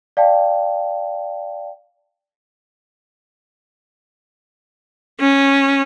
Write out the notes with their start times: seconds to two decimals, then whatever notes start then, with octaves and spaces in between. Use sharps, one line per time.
0.17 D5 F5 G5 A5
5.20 C#4